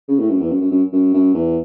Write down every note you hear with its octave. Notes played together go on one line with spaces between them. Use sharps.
C#3
A2
F#2
E2
F#2
F#2
F#2
F#2
F#2
E2